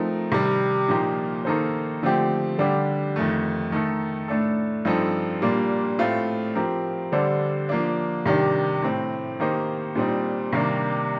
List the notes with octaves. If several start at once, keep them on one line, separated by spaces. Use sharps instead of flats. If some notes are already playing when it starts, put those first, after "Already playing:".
Already playing: F3 A3 C4 D#4 A#4
C3 D#3 G3
A#2 F3 A#3 D#4 G4
D#3 A#3 D#4 A4 C5
D3 F3 A3 C4 G4
D3 G3 D4 G4
F2 D#3 A3
D#3 A3 D#4 A4
A2 A3 D4 A4
G2 F3 C4 D#4 A4
A#2 G3 A#3 D4
A2 A3 C4 F4
F3 C4 G4 A#4
D3 G3 D4 A4 C5
F3 A#3 D4
C3 D#3 G3 D4 G4
A2 A3 C4
D#3 A#3 D#4 G4 C5
A#2 G3 C4 D#4
C3 D#3 G3 A#3 D4